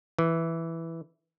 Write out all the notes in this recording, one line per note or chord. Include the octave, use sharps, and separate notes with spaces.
E3